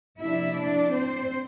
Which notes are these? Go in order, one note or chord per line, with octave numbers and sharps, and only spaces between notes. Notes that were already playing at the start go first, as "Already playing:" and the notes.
C3 F3 A#3 D4 E4 E5
D4 D5
C4 C5